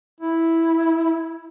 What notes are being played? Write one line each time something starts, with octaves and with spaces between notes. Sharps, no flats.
E4